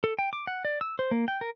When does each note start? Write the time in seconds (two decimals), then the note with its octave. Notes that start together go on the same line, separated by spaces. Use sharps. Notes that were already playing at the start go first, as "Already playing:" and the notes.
0.04 A4
0.19 G5
0.33 D6
0.47 F#5
0.65 D5
0.81 E6
0.99 C5
1.11 A#3
1.28 G5
1.41 A#4